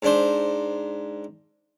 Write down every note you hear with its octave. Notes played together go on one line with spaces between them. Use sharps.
G#2 D4 C5